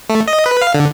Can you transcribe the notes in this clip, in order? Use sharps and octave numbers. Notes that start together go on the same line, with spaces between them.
A3
D#5
B4
F5
D3